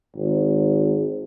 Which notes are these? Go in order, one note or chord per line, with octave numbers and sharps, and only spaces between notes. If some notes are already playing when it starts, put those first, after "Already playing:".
G#1